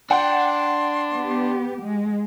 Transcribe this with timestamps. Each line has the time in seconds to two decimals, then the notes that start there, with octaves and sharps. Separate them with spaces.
0.11 D4 F#5 G5 C6
1.13 B3 G4
1.80 G#3